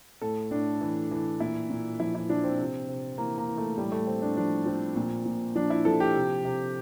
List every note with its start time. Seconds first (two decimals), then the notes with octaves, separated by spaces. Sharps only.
0.21 A2 A4
0.51 A2 D4
0.81 E3
1.11 E3
1.40 A#2 E4
1.70 A#2
2.00 F3 E4
2.15 E4
2.29 F3 D4
2.44 C4
2.59 C3
2.88 C3
3.18 E3 A#3
3.38 A#3
3.48 E3
3.58 A3
3.77 A2 G3
3.92 A3
4.07 A2 C4
4.22 D4
4.37 F3 D4
4.66 F3 C4
4.96 A#2
5.25 A#2
5.56 F3 D4
5.70 E4
5.85 F3 A4
6.00 G4
6.15 C3
6.45 C3